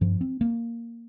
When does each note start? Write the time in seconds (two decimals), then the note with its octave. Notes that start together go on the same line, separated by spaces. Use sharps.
0.01 G2 F3
0.21 C4
0.41 A#3